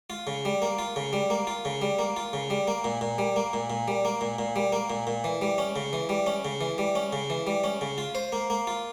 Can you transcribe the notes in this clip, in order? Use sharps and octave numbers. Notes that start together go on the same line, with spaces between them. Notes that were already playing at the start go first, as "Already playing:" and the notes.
F4
C#3
G3
A#3
F4
C#3
G3
A#3
F4
C#3
G3
A#3
F4
C#3
G3
A#3
A#2
A#2
G3
A#3
A#2
A#2
G3
A#3
A#2
A#2
G3
A#3
A#2
A#2
E3
G3
C#4
C#3
E3
G3
C#4
C#3
E3
G3
C#4
C#3
E3
G3
C#4
C#3
F4
C5
A#3
A#3
F4